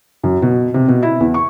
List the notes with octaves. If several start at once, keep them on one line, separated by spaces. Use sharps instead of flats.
F#2
B2
C3
B2
E4
E2
C#6